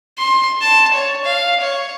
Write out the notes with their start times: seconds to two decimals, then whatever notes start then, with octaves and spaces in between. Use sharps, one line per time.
0.18 C6
0.61 A5
0.93 C#5
1.25 F5
1.60 C#5